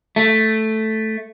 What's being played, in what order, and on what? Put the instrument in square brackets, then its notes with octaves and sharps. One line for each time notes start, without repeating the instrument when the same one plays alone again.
[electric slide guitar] A3